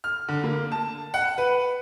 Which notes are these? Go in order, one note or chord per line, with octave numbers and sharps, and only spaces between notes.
F6
D3
A#3
A5
F#5
B4